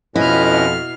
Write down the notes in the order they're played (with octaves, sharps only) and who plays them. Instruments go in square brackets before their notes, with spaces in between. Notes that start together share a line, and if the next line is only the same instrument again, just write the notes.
[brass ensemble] F2 [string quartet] B2 F6 [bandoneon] C#4 B4 D#5 [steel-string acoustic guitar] E4